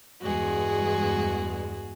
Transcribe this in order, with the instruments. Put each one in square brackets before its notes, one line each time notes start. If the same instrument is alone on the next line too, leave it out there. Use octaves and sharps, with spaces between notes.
[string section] E2 G2 G#3 [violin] F#4 G#4